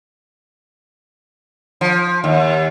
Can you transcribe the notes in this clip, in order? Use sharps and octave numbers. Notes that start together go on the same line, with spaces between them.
F3
D#2